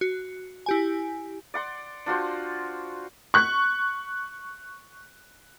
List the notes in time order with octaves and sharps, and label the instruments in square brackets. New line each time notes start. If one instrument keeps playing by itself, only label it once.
[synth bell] F#4
E4 G4 G#5
[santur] D5 F#5 C6
D4 F4 F#4 C5
[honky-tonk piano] C#6 F#6